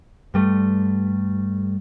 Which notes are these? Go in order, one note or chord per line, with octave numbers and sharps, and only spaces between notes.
G2 G3 A3